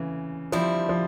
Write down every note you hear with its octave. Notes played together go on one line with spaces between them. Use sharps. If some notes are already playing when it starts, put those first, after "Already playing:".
Already playing: C#3 E3
D3 F3 G3 C4 E4
F3